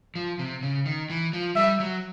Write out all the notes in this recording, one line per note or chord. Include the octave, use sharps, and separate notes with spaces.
F3
C3
C#3
D#3
E3
F3
G3 E5
F#3